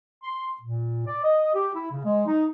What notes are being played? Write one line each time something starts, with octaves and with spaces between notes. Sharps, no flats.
C6
A#2
D5
D#5
G4
E4
C#3
G#3
D#4